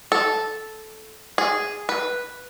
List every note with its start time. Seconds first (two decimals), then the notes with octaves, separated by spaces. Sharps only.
0.12 A4
1.38 G#4
1.89 B4